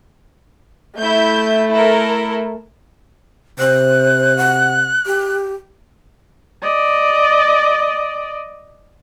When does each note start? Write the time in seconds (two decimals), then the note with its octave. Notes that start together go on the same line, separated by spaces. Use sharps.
0.98 A3 E4 G6
1.71 E4 A4 A#4
3.59 C3 C5 F#6
4.37 F#5
5.06 G4
6.62 D5 D#5